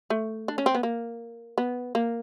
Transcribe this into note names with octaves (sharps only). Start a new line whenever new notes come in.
A3
D4
C#4
C4
B3
A#3
B3
A#3